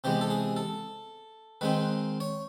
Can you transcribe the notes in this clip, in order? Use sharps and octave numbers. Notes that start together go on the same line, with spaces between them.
C3 E3 G#3 B3 G4
A4
G#4
A4
D#3 G#3 C4 D#4 B4
C#5